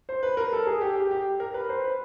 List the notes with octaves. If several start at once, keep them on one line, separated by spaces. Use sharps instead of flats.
C5
B4
A#4
A4
G#4
G4
G4
G4
A#4
B4
C5
B4